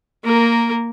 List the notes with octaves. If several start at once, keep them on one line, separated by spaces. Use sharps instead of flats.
A#3 A#4